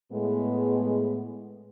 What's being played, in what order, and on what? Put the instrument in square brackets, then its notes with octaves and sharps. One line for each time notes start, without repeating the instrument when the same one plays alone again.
[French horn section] A2 G#3 B3